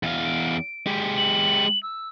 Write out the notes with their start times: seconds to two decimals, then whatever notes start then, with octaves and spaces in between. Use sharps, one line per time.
0.03 E2 F5
0.24 D7
0.87 G#3 G4
1.17 F#7
1.83 E6